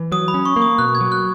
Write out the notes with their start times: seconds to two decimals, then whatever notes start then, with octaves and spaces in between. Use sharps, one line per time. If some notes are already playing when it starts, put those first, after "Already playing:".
Already playing: E3
0.12 F#3 D#6
0.28 B5
0.34 C#4
0.46 C#6
0.56 A#3
0.62 D#6
0.78 B2 F#6
0.95 G#6
1.01 F#3
1.12 F#6